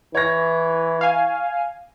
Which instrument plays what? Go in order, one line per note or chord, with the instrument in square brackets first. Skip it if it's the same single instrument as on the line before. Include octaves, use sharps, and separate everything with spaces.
[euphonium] E3 [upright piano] C#5 A#6
[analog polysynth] F5 G#5